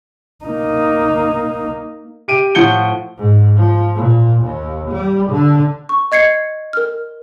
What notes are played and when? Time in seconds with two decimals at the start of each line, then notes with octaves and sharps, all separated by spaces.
0.45 A#3 D#4
2.28 G4 D7 D#7
2.55 A2 F3 F#5 G6 C#7 G7
3.18 G#2
3.57 F3
3.95 A#2
4.43 D#2
4.91 G3
5.31 D3
5.89 C#6
6.12 D#5 G#6 C7 C#7
6.73 A#4 F6